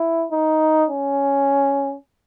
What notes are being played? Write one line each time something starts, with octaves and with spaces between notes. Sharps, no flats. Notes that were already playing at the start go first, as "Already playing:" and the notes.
Already playing: E4
D#4
C#4